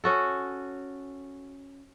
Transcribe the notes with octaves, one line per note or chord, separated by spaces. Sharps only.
C#4 F#4 A4